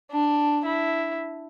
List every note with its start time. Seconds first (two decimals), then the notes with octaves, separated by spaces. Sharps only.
0.11 D4
0.65 E4